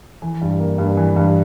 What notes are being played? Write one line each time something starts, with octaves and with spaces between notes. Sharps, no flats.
E3
G2
A#3
G2
E3
G2